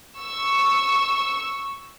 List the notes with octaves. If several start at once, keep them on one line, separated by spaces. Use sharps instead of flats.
C#6 E6